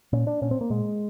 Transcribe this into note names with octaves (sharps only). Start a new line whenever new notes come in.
A#2 C#4
D4
A#2 C#4
C4
A#3
A#2 G#3